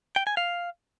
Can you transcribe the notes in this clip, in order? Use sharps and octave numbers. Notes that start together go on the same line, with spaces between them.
G5
G#5
F5